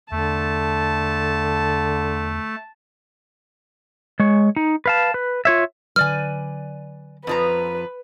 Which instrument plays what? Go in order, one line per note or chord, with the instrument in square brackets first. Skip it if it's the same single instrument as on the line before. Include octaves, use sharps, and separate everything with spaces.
[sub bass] E2 [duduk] D3 [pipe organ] A3 [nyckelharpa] A5
[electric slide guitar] G#3 C#5
D#4
B4 F5 A5
B4
F4 C#5 E5
[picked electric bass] D3 F#3 [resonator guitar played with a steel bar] B4 D5 G#5 [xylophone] F6
[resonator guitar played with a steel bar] F2 F3 A#5 [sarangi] B4